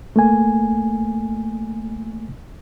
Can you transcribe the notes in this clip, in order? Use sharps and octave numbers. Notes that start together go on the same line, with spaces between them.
A3 A#3 G#5